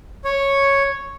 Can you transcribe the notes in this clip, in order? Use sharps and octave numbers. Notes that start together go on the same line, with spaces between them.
C#5